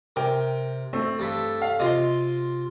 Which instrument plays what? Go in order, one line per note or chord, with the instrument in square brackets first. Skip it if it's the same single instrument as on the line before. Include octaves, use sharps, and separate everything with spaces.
[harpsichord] C3 [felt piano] A#4 G5
[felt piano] A3 C4
[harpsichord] G2 A4 B5
[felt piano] F5
[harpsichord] C3 F4 C6 [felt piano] D#5